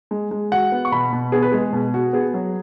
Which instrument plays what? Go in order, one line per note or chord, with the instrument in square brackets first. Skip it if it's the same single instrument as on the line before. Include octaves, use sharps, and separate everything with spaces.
[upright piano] G#3
G#3
[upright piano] F#4 [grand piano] F#5
[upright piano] B3
[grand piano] C#6
[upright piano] B2 [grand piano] B5
[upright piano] B2
[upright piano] B3 [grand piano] G#4
[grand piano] B4
[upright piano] G#3 [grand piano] G#4
[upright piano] B2
F#4
[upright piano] B3 [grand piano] G#4
[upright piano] F#3